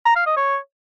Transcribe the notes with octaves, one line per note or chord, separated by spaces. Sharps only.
A#5
F5
D#5
C#5